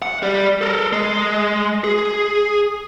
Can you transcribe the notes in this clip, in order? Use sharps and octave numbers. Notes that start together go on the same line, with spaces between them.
F#5
G3 D5
A4 A#4
G#3
G#4